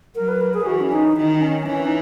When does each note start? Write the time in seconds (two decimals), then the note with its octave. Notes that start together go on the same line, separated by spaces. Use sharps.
0.15 F#3 A#4
0.28 B4
0.41 A#4
0.54 G#4
0.66 E3 F#4
0.81 C#4
0.92 D#4
1.17 D#3 D#4
1.41 C#4
1.67 E3 C#4
1.85 D#4